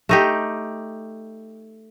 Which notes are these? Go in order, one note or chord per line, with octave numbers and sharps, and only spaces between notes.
A3 D#4 G4